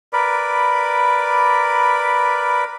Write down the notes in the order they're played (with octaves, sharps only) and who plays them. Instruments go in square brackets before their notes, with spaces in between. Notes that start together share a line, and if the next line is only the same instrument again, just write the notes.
[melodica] A#4 B4 D5 B5